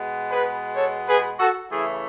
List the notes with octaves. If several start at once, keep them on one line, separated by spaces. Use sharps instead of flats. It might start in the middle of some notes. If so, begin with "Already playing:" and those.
Already playing: B2 G#3 B3
G#4 B4
A4 C#5
G#4 B4
F#4 A4
C#3 E3 A3 E4 G#4